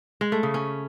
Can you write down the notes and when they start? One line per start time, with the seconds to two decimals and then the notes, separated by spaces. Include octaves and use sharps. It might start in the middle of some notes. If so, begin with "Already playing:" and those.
0.21 G#3
0.32 A3
0.43 C#3
0.54 C#4